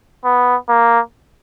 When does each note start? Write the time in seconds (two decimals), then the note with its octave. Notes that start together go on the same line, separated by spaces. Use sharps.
0.25 B3
0.69 A#3